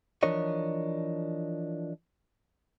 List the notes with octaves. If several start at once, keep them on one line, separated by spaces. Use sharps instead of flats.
E3 F3 D4 A#4 C#5 D#5